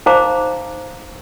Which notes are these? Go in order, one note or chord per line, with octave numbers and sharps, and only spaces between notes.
D#4 C5 F5 A#5 D6